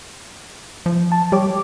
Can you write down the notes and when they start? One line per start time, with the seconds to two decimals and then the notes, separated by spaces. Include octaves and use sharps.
0.86 F3
1.12 A5
1.32 G3 G4 C#5 D6